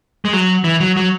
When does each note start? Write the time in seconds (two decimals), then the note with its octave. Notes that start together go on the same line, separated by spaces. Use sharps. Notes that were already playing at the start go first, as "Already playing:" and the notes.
0.25 G#3
0.33 F#3
0.64 E3
0.80 F#3
0.97 F#3